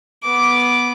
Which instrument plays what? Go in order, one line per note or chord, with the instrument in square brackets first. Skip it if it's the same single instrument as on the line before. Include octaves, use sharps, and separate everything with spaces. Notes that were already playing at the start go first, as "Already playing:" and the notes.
[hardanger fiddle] B3 D6